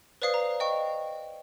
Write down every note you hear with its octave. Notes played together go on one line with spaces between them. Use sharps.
B4 C5 D5 F5 D#6 C7
A#5
D#5 G5 C#6